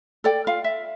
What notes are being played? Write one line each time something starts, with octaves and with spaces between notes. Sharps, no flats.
A4 D5 G5
F4 F5
E5